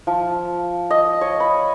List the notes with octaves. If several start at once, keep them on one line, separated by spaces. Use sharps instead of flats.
F3
D#5
C#5
B5